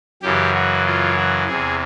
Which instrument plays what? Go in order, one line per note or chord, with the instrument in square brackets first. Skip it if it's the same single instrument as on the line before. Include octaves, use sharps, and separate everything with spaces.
[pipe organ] F#2 C#3 E3 G4
F#4
F4
F#4
E2 C3 E3 G#4